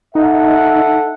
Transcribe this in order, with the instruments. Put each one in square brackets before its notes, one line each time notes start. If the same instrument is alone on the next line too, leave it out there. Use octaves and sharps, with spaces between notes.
[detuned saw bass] D#4 [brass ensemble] A4 E5 F#5